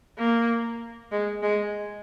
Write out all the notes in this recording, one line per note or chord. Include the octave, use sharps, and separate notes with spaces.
A#3
G#3
G#3